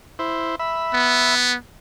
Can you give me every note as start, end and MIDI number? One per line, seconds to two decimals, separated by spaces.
0.19 0.55 64
0.19 0.55 72
0.59 1.35 76
0.59 1.35 83
0.94 1.56 59